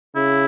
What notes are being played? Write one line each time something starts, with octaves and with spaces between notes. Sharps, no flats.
C#3 E4